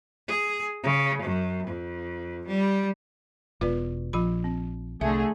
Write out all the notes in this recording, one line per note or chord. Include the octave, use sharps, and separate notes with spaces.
G#4
C#3
F#2
F2
G3
E1 B2 F4 B4 D5
A#1 F3 F4 B5
C4
C2 D3 A3 G#4 E5